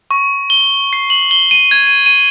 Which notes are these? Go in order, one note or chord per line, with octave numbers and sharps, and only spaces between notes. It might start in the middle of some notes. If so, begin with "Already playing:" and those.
C#6
G7
C7
F#7
G7
D#7
G#6
D#7
D#7